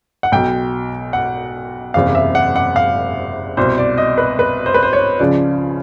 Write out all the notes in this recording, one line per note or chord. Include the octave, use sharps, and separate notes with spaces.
F#5
B1 B2 G5
F#5
F#1 E2 C3 F5
E5
F#5
F#5
F5
C2 B2 C5
D5
D#5
B4
B4
C5
B4
C5
C#5
C#2 C#3 F3 D5